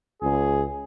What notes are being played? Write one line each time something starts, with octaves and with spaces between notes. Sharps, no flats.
C#2 G#4